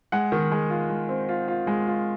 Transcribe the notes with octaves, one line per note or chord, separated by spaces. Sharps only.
G#3 F#5
D#3
G#3
F4
G#3
C4
F4
F4
G#3
F4